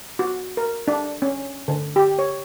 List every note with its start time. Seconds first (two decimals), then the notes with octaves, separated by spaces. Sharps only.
0.19 F#4
0.57 A#4
0.88 D4
1.22 C#4
1.68 D3
1.96 G4
2.19 C#5